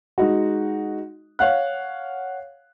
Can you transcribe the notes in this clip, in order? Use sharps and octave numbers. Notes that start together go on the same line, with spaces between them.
G#3 D#4 F#4
C#5 F5 F#5 F#6